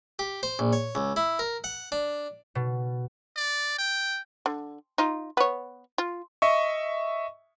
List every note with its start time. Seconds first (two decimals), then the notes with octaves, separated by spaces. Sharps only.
0.19 G4
0.43 C5
0.59 A#1
0.73 C#5
0.95 C#2
1.16 E4
1.39 A#4
1.64 F#5
1.92 D4
2.55 B2
3.36 D5
3.78 G5
4.46 D3
4.98 D#4 F4
5.37 B3 C#5
5.98 F4
6.42 D#5 E5 C#6